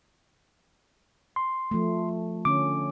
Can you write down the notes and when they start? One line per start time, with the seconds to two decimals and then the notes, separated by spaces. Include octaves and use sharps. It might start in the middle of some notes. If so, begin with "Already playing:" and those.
1.36 C6
1.71 F3 A3
2.45 D3 C#4 D6